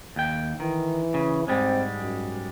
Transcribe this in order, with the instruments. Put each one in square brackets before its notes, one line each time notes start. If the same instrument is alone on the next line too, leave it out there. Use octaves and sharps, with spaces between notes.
[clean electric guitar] D#2 G5
[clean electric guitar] D#3 [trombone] E3
[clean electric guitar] C#3
[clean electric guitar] G#2 G3 G#3 [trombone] C4
[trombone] F#2